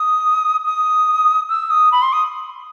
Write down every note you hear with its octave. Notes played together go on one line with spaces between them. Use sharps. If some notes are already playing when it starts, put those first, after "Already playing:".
Already playing: D#6
D#6
E6
D#6
B5
C6
D#6